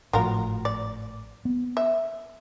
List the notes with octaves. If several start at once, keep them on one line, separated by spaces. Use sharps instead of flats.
G#1 A2 F3 F#3 F4 A#4
D5
B3
E5